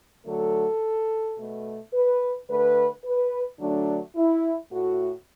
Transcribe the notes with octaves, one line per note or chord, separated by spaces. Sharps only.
D3 F#3 A3 A4
B2 A3
B4
D3 A3 B4
B4
D3 F#3 A3 D4
E4
A2 A3 F#4